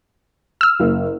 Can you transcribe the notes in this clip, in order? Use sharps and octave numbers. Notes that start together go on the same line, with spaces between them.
E6 F6
F#1